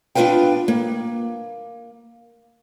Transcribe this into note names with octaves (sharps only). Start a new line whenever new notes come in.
B3 D4 F4 B4 F5 G5
A#3